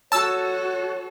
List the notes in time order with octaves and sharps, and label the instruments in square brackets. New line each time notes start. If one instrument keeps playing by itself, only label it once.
[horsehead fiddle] F#4 A4 [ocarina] C#5 [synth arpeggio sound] A5 E6